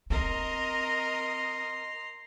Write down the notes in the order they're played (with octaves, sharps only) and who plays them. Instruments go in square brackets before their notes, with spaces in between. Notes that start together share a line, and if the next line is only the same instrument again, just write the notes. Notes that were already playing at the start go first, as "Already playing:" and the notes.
[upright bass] C4 [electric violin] A#4 D#5 [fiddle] A#5 C6